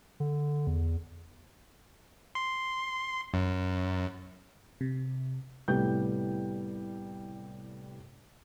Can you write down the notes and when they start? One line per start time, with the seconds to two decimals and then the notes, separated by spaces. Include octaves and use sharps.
0.20 D3
0.67 E2
2.35 C6
3.34 F#2
4.81 C3
5.68 C2 A2 G3 B3 G5 G6